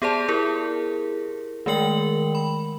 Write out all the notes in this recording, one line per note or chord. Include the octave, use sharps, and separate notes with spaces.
B3 G4 G#4 C5 D5 A5
E4 G4 G#4 A#4
D#3 G#3 A3 A#4 G5 F#7
B5